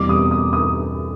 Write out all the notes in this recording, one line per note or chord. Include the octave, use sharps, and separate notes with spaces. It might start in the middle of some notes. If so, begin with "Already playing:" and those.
Already playing: E2 B2 G3 C4 D6
D#6
D#6
D#6